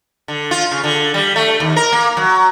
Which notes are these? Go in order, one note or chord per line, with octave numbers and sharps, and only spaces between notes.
D3
F4
C#3
D3
G3
A3
D#2
A#4
A#3
F#3